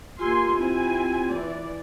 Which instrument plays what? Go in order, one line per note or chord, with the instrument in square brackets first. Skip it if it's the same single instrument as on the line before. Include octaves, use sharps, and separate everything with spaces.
[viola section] A#3 G#5 C6 [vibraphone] F4 G4 E6
[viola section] C4 E4 G#5
E3 D5